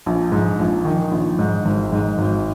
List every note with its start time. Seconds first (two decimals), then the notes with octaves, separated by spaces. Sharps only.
0.06 A#1
0.32 G#2
0.59 A#1
0.85 D#3
1.12 A#1
1.39 G#2
1.65 G#1
1.92 G#2
2.18 G#1